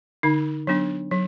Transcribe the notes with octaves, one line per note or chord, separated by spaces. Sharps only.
D3 D#4
F#3 B3 D4
F#3